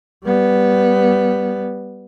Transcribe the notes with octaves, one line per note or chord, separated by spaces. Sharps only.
G3 B3